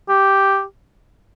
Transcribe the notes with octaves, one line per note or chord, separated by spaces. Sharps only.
G4